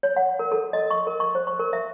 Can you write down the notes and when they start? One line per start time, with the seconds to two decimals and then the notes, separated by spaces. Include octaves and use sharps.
0.03 C#5
0.17 F#5
0.39 A#4
0.52 A4
0.73 D#5
0.91 C#6
1.07 A#4
1.20 C#6
1.35 C5
1.47 C#6
1.60 A#4
1.73 E5